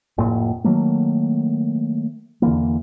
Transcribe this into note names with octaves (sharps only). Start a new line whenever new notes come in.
F1 A2 A#3
D#3 F#3 A3 A#3
E2 D3 E3 A#3